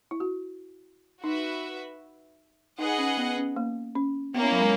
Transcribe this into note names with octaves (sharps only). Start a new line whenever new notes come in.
E4
F#4
D#4 F#4 B4 E5
D#4 G#4 B4 D#5 F#5
C#4
B3
C#4
A#3
C#4
A#3 B3 C#4 E4
F#3
G#3